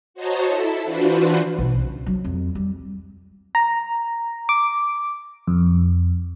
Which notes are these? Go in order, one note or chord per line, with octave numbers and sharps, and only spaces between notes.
F#4 C5 C#5 D#5 A5 A#5
E4 A4 E5
E3 D4 F4 F#4 B4 C5
B1
C#3
F#3
F2
G3
A#5
D6
F2